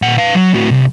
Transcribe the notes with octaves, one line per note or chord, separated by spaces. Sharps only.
A#2 F#5
B4 F5
F#3
A2 F#4
C2